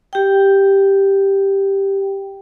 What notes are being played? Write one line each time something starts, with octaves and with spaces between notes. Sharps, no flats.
G4 G5